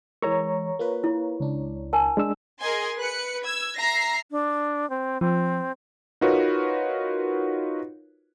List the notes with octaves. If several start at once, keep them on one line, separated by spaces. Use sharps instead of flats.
E3 G#3 A#4 C#5 A#5 C#6
A#3 F4 B4
E4
C#2 D4
A#4 G#5 A5
G#3 D4 E6
G#4 A#4 D#5 G#5 C6
B4 F#6 C#7
E6 G#6
E5 A#5 A#6 C7
D4
C4
F3 C4
D#4 F4 F#4 A#4 B4 C#5